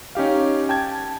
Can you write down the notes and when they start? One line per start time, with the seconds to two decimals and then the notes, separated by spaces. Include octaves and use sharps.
0.15 C#4 D#4 G4 F5
0.69 G5 A5 G#6